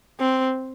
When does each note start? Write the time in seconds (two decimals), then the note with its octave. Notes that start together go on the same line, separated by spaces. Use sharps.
0.20 C4